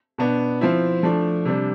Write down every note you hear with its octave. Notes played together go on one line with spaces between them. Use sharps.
B2 B3 D4
F3 C4 E4
F3 A3 D4
C3 G3 D4